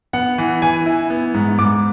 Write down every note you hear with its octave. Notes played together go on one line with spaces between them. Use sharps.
B3 F#5
E3
E3 G#5
E4
B3
G#2
G#2 D6